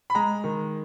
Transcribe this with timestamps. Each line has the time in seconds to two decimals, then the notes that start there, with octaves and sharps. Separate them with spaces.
0.10 B5
0.15 G#3 A#5
0.44 D#3